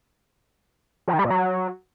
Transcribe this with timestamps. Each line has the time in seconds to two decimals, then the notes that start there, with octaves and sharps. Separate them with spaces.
1.08 F3
1.13 D#3
1.19 G3
1.25 A#2
1.30 F#3